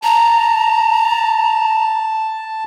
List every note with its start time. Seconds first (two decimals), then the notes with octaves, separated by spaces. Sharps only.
0.03 A5 A#5